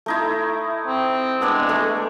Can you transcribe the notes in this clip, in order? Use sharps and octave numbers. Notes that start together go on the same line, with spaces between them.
A3 D#4 E4
C4
G#3 B3 D4 D5
A3 A4 D6